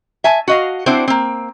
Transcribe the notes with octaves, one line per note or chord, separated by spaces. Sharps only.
E5 G#5 A5
F#4 D#5 F5
C4 D4 E4 F#4 C5 D5
A#3 C4